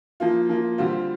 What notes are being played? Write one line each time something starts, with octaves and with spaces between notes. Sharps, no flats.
F3 A#3 F4
F3 A#3 F4
D3 G3 C4 F4